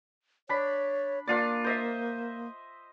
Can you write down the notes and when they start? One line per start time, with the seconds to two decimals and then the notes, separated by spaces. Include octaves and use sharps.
0.49 D4 C#5 B5
1.27 A#3 D4 F4 D5
1.64 C5 D#5 E5